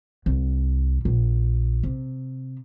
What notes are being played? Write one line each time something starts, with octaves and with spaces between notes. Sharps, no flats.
C2
A#1
C3